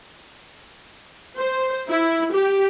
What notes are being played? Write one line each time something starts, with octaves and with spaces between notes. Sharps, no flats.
C5
E4
G4